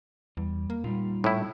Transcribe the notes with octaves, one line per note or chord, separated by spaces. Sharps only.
E2 G3
A#3
A#2 G3 D#4 F4
A2 E4